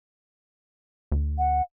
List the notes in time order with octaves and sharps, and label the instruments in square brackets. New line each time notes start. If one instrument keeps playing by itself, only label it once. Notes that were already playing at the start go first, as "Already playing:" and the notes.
[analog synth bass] D2
[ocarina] F#5